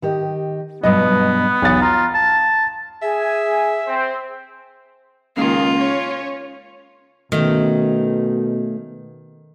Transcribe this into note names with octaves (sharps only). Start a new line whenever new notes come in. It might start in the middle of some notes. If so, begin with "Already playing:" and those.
D#3 G4 D#5
G2 B2 F#3 B3 D#5
B1 E2 F5 A6
F4 A#5
A5
G#4 E5 G#5
C4 C5
C#2 D#3 A#3 F4 G#4
C#4 C#5
B2 D#3 A3 C#4